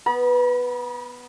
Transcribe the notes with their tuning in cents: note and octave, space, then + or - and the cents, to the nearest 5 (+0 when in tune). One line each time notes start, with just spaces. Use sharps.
B3 +0 B5 -45